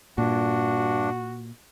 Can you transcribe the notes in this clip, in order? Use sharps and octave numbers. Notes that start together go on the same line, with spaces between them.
G2 A#2 D4 F#4